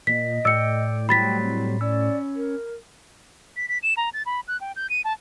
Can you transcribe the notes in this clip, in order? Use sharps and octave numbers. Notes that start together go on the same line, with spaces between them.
A#2 D#5 B6
A2 D5 G5 E6 C#7
F#3 G3 C5 G5 B5 A6 B6
C4
C#4 D5 E6
A#4
B6
B6
E7
A#5
A6
B5
F#6
G5
G6
D#7
A5